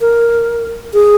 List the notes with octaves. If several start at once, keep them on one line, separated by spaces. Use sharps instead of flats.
A#4
G#4